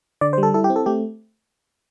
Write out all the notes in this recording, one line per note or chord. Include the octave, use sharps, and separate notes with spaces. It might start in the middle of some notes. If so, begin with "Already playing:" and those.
D3 D5
C5
G3
A4
E4 A4
G4
C4
A4
A3 G4